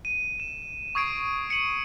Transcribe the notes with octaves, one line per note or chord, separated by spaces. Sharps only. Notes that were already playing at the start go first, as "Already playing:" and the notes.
D#7
E7
C#6 D#6 G#6 C7 D7 E7
C#7 D#7 F#7